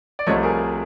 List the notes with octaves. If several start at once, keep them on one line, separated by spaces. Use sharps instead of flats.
D5
C2 C3 F3 A3 C#5 D#5
G#4 A#4